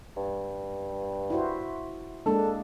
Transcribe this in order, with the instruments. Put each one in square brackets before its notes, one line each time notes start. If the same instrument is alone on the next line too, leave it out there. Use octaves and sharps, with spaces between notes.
[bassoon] G2
[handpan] E4 F#4 C5
[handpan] G#3 A#3 D4 [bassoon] A4